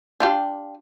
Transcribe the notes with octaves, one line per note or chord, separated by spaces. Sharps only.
D4 F4 G4